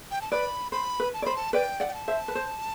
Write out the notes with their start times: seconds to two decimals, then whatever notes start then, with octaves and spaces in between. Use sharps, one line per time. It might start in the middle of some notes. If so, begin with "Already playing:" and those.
0.11 G5
0.22 A5
0.32 B4 D5 B5
0.72 C5 B5
1.00 B4
1.14 A5
1.22 C5 D5 B5
1.36 A5
1.53 B4 D5 G5
1.80 D5 F#5
1.88 G5
1.94 A5
2.08 C5 E5
2.28 B4
2.35 C5